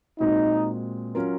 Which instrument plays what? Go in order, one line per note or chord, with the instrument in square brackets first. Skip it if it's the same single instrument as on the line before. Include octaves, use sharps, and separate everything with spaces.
[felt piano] A#2 G#3 C4 F#4 [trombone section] D#4
[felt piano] F#3 C#4 F4 A#4